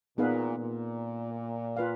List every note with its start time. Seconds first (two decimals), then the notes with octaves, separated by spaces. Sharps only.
0.17 A#2 B3 D#4 G#4 B4 F5
0.58 A#2
1.77 F4 B4 F5